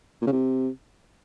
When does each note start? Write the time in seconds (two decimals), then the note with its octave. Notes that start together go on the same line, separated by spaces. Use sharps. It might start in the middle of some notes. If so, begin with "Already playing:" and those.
0.21 A#2
0.27 C#3
0.32 C3